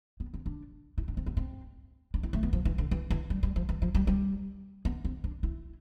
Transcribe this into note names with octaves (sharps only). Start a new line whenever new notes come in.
B3
C4
D4
E4
D4
C4
B3
C4
D4
E4
A3
B3
F3
E3
D3
E3
E3
G3
G3
F3
E3
F3
G3
G3
B3
C4
D4
E4